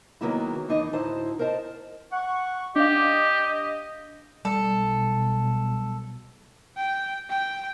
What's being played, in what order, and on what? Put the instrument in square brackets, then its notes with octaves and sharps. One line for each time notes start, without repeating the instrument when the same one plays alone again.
[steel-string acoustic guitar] D#3 F#3 G#3 A#3 B3 E4
D#2 E3 D4 D#4 D#5
D2 A2 D#4 E4 C5 A5
A#4 C5 D#5 A5
[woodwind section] F#5 C#6
[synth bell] D4 F5 [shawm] G4 [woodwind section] D#5
[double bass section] B1 [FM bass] G3 [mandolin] A4
[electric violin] G5
G5